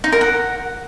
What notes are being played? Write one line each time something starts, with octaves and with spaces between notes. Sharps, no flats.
D#4
A#4
F#5